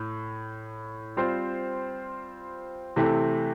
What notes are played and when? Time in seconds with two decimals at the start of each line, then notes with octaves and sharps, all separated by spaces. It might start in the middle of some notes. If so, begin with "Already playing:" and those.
Already playing: A2
1.17 G3 C4 F4 C5
2.96 C3 E3 A3 C4 G4